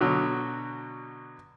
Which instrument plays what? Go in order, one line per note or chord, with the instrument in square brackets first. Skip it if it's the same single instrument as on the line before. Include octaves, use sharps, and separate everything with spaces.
[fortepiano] B2 D3 F#3